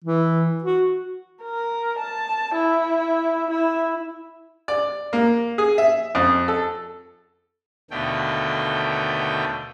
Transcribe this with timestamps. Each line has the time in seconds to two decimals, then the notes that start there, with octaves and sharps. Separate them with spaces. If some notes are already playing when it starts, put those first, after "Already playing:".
0.05 E3
0.64 F#4
1.43 A#4
1.99 A5
2.55 E4
3.50 E4
4.68 D5
5.13 A#3
5.58 G#4
5.78 E5
6.15 F2
6.48 A4
7.91 D#2 B2 D3 A3 G5